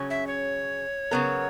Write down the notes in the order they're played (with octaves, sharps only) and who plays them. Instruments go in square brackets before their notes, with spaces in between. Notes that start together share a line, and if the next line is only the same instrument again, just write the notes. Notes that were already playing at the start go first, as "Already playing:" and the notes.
Already playing: [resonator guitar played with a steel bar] C#3 F#3 C#4
[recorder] E5
C#5
[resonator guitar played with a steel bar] C#3 F#3 B3 F#4 A#4